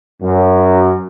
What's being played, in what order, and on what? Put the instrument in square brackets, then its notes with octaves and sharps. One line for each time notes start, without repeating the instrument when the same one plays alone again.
[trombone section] F#2